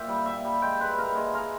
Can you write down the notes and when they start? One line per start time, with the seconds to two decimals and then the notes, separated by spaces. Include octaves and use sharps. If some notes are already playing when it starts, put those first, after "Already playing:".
Already playing: A#2 E5 G5
0.09 G3
0.26 A#2 E5
0.45 G3
0.62 G#3 G5
0.80 G#3 B4
0.98 A#2 A#4
1.16 G#3 G#4
1.34 G#3 A#4